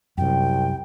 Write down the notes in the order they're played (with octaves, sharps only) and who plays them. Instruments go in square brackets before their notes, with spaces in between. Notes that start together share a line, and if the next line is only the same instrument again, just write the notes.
[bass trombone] C2 [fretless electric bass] F#2 C3 [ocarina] G5